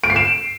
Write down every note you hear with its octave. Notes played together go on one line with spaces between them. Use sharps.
D7
C7
E7